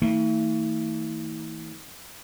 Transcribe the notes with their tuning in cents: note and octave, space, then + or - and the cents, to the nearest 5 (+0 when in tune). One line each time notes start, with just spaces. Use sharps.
E3 -45 A3 +45